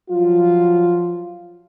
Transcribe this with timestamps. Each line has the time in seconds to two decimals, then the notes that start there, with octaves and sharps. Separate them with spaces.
0.10 F3 F#3 F4